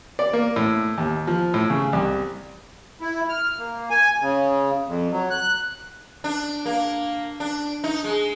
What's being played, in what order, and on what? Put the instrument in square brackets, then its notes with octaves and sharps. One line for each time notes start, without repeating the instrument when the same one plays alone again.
[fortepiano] D5
A#3
A2
D#2
F3
A2
C#3
C2
[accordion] E4
F6
A#3
G#5
C#3
F2
F#3
F#6
[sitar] D4
A#3
D4
D#4
G#3